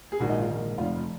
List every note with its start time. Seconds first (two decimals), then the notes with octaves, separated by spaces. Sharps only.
0.12 G#4
0.20 A#1 G#2 D#3 F#4
0.29 D#4
0.39 F4
0.49 A#1 G#2 D#3
0.78 F1 F2 F3 F4